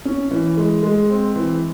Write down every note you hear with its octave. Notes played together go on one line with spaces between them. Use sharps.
C#4
E3
G#3
G#3
C4
E3